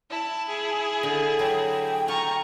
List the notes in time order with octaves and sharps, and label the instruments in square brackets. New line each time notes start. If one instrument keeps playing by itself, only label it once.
[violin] E4 [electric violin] A5
[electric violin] G#4
[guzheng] D3
[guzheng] F#3 [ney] G5
[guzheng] F4 [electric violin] A#5 C#6